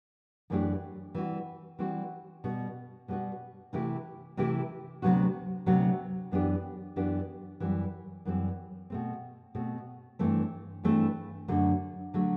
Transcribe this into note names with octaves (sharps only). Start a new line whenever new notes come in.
F#2 E3 A3 D4 G4
E3 G3 C4 F#4
E3 G3 C4 F#4
B2 G3 B3 F#4
B2 G3 B3 F#4
C3 E3 A3 E4 G4
C3 E3 A3 E4 G4
D2 C3 F#3 B3 F#4
D2 C3 F#3 B3 F#4
F#2 E3 B3 D4 G4
F#2 E3 B3 D4 G4
F#2 E3 G3 C4
F#2 E3 G3 C4
B2 A3 C4
B2 A3 C4
G2 E3 A3 C4
G2 E3 A3 C4
F#2 D3 F#3 A3
D3 F#3 A3